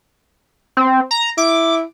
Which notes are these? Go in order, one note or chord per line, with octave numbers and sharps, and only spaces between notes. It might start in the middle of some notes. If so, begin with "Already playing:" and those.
C4
A#5
E4 D6